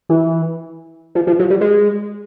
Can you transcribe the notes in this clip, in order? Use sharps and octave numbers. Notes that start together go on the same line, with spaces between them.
E3
F3
F3
F#3
G3
G#3